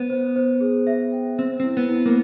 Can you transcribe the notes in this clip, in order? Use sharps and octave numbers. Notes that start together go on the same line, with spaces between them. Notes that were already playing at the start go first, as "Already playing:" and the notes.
Already playing: B3 C5
C5
C5
G#4
E5
G5
C4 C5
C4 E4
B3
E4
A#3